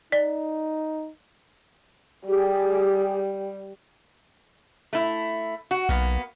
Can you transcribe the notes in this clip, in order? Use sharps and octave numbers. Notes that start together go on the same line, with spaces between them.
D#4 D5
G3 G4 G#4
A3 E4
F#4
B1 A#3 B3